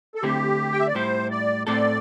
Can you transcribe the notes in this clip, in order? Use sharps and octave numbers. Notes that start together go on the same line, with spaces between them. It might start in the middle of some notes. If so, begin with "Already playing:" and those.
A4
D3 A3 C4 E4 G4
G5
E5
D5
A2 G3 E4 G4 C5
D5
A2 A3 C4 A4 D5